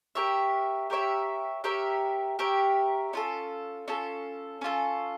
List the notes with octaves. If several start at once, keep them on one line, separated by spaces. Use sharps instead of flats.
G4 A#4 C#5 E5
G4 A#4 C#5 E5
G4 A#4 C#5 E5
G4 A#4 C#5 E5
C#4 F4 A4
C#4 F4 A4
C#4 F4 A4